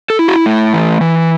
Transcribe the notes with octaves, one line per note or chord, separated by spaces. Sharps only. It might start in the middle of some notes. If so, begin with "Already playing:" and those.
A4
E4
F#4
A3
E3
E3